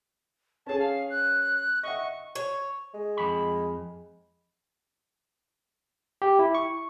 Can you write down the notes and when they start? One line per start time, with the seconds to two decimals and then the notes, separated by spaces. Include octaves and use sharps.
0.66 C#4 G#4 A5
0.79 F5
1.10 F#6
1.83 D#5 E5 F#5 C#6
2.35 C#5
2.94 G#3
3.17 F2 B5
6.22 G4
6.39 E4
6.55 C#6